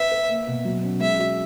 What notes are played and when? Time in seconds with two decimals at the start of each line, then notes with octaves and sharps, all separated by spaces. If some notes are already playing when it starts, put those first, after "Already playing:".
Already playing: B4 E5
0.12 B4
0.29 A#3
0.47 B2
0.65 F#3
0.83 C#4
1.01 G#3 E5
1.19 F#4